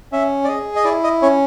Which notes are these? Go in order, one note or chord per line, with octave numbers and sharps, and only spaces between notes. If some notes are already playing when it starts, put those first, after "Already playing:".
C#4 E5
D5
G#4 D#5
D#5
E4 D5
D#5
C#4 C#5